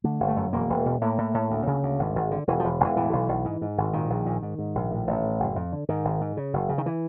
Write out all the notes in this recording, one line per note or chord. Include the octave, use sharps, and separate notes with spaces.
D3 A3
G1
A3
F#2
E1 A#3
E1
B2
A2 A#3
A2
A2
D2
C#3
D2
G#1
G#1
D3
E1 E3
F3
E1
E1 E3
A2 E3
B1
B1
G#2
G#2
G#1
A#2 D#3
A#1
A#2
G#2
G#2
A#1
A2
A1
A2
F#1
F2
D3
G#2 D#3
G#1
G#2
C#3
F#1
C#3
D#3
E3